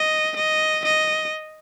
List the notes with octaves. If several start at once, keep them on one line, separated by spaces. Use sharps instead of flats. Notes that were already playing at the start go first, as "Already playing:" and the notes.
Already playing: D#5
D#5
D#5